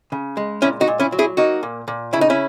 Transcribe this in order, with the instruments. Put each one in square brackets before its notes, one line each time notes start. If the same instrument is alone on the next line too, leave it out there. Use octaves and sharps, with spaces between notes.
[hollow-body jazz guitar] C#3
G#3
A#2 C#4 E4
D#4 F#4
A#2
C#4 E4
F#3
E4 G#4
A#3 D#4 F#4
A#2
A#2
C#3 E4
D#4
C#4 E4